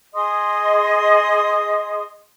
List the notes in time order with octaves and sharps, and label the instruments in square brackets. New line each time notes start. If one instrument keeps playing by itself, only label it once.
[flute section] G#4 D#5 C6 D#6